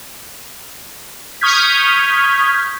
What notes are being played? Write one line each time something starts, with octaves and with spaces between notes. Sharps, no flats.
C#6 D#6 F6 G6 G#6 B6